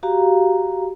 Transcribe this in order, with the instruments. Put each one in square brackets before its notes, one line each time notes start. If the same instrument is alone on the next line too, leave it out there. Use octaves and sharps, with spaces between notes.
[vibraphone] F#4 G4 F5 A#5